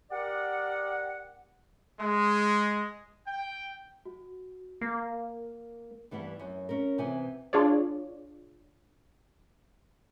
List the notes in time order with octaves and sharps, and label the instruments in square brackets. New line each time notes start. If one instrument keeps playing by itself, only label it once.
[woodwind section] G4 A#4 D5 F#5
[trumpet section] G#3
G5
[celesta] F#4
[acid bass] A#3
[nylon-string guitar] G2 E3 G3 B3
F#2
C#4 A#4
C3 E3 B3 G#5
[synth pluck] D4 F4 G#4 C#5 D5